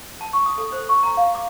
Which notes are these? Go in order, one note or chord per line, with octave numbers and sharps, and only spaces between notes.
A5
C#6
D#6
A4
C5
C#6
A#5
F5
D6